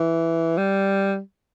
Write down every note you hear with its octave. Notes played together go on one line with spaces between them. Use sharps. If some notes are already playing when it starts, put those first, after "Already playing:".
Already playing: E3
G3